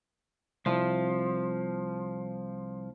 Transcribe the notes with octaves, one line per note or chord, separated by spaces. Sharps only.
C2 F3